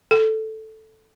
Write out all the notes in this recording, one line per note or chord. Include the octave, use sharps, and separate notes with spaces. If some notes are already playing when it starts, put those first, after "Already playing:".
A4